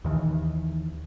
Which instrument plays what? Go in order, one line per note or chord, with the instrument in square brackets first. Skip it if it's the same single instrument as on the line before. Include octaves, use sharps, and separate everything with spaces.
[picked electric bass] D#2 D#3 E3